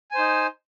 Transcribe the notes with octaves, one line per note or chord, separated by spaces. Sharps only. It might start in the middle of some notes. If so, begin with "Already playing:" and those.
D#4 C5 G#5